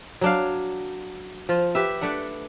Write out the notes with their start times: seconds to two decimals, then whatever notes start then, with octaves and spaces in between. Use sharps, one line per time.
0.21 F#3 D4 F5
1.49 F3 F4
1.75 G4 B4 E5
2.01 A3 D4 B4 F#5